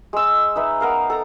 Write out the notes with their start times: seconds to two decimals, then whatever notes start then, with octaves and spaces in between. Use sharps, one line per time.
0.13 G#3 E6
0.56 D#4 B4 E5 B5
0.81 B3 A#4 F5
1.10 A4 A#5